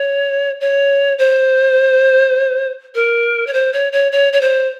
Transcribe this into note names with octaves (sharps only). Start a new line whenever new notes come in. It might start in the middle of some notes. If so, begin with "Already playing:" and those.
Already playing: C#5
C#5
C5
A#4
C#5
C5
C#5
C#5
C#5
C#5
C5